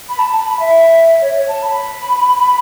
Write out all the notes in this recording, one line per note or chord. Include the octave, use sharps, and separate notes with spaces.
B5
A5
A5
B5
E5
C#5
C#5
A5
B5